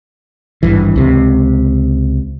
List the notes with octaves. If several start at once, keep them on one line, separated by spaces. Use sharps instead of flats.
G#1 G2 E3
C#2 C3